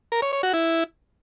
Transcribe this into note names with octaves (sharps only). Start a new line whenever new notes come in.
A#4
C#5
C#5
F#4
E4